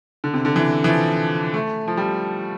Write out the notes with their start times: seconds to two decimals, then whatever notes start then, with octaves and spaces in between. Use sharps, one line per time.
0.24 D3
0.34 C3
0.45 D3
0.56 E3
0.84 E3
0.89 F3
1.54 A3
1.88 F3
1.97 G3